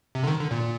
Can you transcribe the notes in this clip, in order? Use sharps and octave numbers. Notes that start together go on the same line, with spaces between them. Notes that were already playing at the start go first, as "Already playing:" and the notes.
C3
D3
D#3
D3
A#2